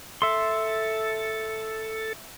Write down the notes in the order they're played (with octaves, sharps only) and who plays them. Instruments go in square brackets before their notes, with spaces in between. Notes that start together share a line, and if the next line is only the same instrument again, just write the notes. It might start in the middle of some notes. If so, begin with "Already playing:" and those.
[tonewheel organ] A4 [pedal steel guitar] E5 C6